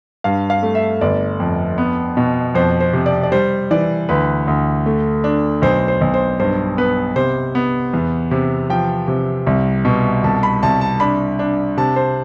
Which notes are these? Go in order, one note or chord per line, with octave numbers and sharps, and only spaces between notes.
G2 F5
F5
A3
E5
G1 D5
F2
B3
B2
F2 C5
C5
C3
D5
D5
G3 C5
E3 D5
D2 B4
D2
A3
D4
B1 C5
C5
B1
C5
G2 C5
B3 B4
C3 C5
B3
E2
C3
F3 G5
C3
C2
B2
C2 A5
B5
C2 A5
A5
D4 B5
D4
C3 A5
C5